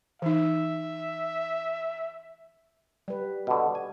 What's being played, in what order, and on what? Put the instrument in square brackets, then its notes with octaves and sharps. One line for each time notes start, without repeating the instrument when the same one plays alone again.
[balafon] E3 D#4 [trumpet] E5
[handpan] G3 B4
[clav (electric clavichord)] B2 D3
G#5